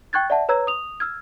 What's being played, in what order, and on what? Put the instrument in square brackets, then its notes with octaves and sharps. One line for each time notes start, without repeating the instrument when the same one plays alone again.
[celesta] G5 C#6 F#6 G#6 A6
D5 E5 F#5 A5
B4 C#5 A#5 E6 G#6
D#6 F7
E6 F6 G#6